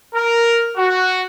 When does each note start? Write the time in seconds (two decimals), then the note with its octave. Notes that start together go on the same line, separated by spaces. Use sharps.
0.15 A#4
0.76 F#4